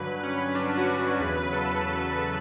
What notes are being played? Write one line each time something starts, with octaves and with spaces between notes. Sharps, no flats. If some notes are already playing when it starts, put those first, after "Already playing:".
Already playing: G2 D3 F#3 B4
C#4
D4
F#4
E2 C#3 F#3 B4
B4
A4
B4
B4
B4